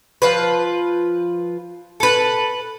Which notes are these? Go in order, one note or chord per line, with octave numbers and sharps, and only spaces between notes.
F3 F4 B4
A4 B4